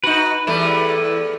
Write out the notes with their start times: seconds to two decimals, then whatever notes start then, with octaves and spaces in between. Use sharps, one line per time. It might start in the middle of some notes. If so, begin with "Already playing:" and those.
0.04 D#4 F#4 B4
0.47 E2 G3 A3 E4 B4